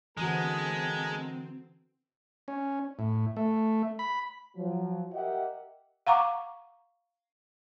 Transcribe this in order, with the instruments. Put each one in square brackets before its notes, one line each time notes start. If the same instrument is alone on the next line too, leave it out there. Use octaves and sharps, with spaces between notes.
[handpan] D3 E3 F#4 [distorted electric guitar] G#3 [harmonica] B3 A#4 A5 [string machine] C4
[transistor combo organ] C#4
A2
A3
B5
[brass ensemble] F3 F#3
G4 A#4 D#5 E5 F#5 G5
[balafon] F5 F#5 A#5 C#6 D6